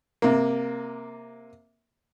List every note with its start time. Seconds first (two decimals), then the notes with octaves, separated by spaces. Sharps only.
0.22 C3 A#3